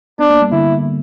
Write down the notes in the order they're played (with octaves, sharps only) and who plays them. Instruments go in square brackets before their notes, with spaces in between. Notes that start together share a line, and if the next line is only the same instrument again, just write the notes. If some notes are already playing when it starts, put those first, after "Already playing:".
[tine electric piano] B3 [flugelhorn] D4
[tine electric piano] A#3
G3
[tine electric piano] D3 [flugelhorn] E4